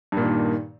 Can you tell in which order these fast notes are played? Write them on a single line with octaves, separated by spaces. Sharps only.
G2 A#2 D#3